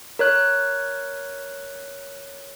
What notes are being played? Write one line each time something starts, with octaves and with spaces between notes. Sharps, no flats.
A#4 C#5 F#6